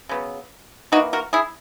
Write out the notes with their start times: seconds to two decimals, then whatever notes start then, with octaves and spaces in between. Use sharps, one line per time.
0.09 C#3 F#3 B3
0.92 E3 D#4 F#4
0.96 A#3
1.13 F#4 A#4
1.33 E4 G#4